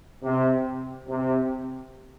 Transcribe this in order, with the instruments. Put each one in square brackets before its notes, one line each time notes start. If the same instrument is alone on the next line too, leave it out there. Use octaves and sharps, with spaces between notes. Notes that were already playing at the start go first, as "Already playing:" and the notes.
[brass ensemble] C3
C3